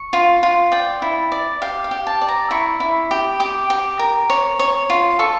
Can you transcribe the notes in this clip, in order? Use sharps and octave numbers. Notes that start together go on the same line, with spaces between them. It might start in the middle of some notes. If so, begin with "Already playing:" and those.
Already playing: C#6
F4
F4
D5 G5
E4
D5
G4 F5
F5
G4
A5
D5
A#5
E4 C#6
E4
G4
G4 D6
G4
A#4
C#5
C#5
F4
A4 C#6